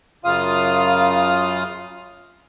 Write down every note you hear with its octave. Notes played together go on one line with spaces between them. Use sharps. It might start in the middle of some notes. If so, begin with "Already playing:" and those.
F#2 C#3 F4 F5 D#6